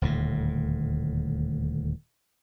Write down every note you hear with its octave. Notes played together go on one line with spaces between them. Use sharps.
D#1 D2 A2